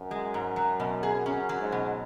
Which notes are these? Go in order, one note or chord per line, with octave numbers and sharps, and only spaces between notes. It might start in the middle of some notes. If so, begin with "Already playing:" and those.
Already playing: F#2
G#3
G#2
F#3
B2
G#4
F#2 C#4
F#3
G#2
B2